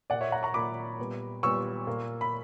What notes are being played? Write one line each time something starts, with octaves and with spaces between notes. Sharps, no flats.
A#2 A#3 D5 F#5
C#5 E5
F#5 A#5
A#5 C#6
A#2 A#3 B5 D6
A#2 G3 B3
A#2 G3 B3 C#6 E6
A#2 A#3
B5